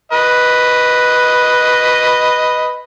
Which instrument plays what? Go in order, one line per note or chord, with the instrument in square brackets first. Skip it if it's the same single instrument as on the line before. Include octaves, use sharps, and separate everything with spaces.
[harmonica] B4 D#5